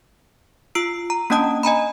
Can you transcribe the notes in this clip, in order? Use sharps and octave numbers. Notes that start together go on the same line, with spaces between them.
F4 E6 C7 D7
A#5
A#3 C#4 D4 D#5 A5 D#6
D#5 G#5 A#5 B5